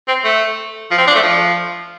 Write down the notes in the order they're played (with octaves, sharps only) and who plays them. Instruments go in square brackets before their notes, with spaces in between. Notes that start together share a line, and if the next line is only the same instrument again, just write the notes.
[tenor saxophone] C4
A3
F3
C4
D4
A3
F3